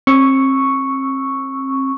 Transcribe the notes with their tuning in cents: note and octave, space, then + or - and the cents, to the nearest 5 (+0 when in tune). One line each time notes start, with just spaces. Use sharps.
C4 +35 C#6 +0 E6 +0